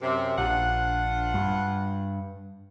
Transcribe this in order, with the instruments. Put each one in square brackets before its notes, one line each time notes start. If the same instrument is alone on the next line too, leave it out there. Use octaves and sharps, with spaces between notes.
[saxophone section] F#2 C3
[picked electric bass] A#1 [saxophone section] D4 F4 F#5
[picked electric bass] G2